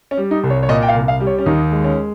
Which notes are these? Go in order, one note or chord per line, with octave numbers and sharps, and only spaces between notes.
C#4
G3
D#4
C2
C#5
C#5
A#2 D#5
G5
F5
C2
F5
G3
C#5
C#4
D#2 D#4
G#3
C#4